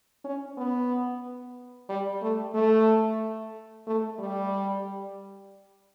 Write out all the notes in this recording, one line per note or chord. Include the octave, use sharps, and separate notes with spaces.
C#4
B3
G3
A3
A3
A3
G3